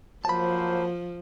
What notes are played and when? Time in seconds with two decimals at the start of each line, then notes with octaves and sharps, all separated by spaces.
0.25 F3 F#3 A#3 C5 A5 B5